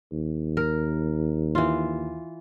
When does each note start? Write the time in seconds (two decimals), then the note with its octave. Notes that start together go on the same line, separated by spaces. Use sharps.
0.12 D#2
0.57 A#4
1.55 E3 F4